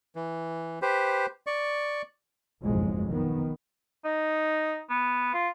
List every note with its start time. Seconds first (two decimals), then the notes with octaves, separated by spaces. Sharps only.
0.15 E3
0.82 G4 B4 C5
1.47 D5 C#6
2.61 F#1 B1 F2 G#2 G#3
3.09 D#3 B3
4.05 D#4
4.90 B3
5.34 F4